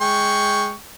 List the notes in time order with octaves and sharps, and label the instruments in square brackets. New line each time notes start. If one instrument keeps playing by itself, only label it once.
[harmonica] G#3 G5 C#6